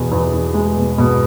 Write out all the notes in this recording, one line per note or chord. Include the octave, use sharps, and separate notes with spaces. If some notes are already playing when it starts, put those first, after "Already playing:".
Already playing: E2 B2
E2
E2
G#3
B2
B2